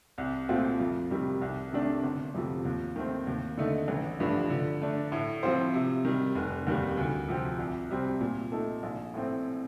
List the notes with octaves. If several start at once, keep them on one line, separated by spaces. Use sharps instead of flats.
C2
A#2 A3 C4 F4
F2
C3 D#3 G3
C2
C3 D#3 A3 D4
G1
F2 C3 F3
D#2
D#3 A3 C4
D#2
D3 A3 D#4
A1
G2 F3 A3 D4
D3
A3 D4
A2
F3 C4 F4 C5
C3
D#3 G3
F1
D#2 D#3 G3
D2
C3 F3 C4 G4
C2
C3 G3 C4
A#2
A3 D#4 A4
A#1
A2 A3 C4